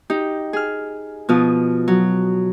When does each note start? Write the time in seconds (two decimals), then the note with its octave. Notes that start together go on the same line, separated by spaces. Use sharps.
0.10 D#4 G4
0.53 G#4 F6
1.29 B2 F3 F4 D#6
1.88 F#3